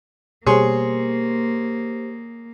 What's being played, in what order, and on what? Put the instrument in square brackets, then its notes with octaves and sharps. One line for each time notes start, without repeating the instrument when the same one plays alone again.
[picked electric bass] B2 G3 [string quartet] A#3 [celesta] G4 C5 [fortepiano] G#4 C#5 C6